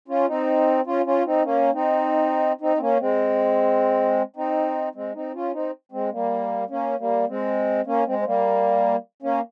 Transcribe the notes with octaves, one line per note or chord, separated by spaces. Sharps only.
C#4 F4
C4 D#4
C#4 F4
C#4 F4
C4 D#4
A#3 C#4
C4 D#4
C4 D#4
C4
A#3 C#4
G#3 C4
C4 D#4
G#3 C4
C4 D#4
C#4 F4
C4 D#4
G#3 C4
G3 A#3
A#3 C#4
G3 A#3
G#3 C4
A#3 C#4
G#3 C4
C4
G3 A#3
A#3 C#4